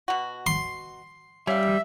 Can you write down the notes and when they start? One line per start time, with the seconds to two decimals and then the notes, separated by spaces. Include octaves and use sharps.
0.08 B2 F#4
0.47 C6
1.47 G3 C#4 E5 F5